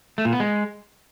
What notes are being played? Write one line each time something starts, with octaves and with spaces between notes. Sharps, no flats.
A3
A#2
B3
G#3